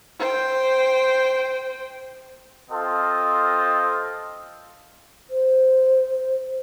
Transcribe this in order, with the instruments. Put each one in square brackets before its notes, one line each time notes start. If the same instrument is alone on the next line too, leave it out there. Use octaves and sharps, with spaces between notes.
[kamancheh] C5 G5
[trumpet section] C4 F4 A4 D#5
[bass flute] C5